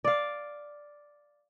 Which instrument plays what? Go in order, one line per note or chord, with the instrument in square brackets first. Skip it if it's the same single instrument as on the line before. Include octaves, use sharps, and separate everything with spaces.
[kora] D5 F5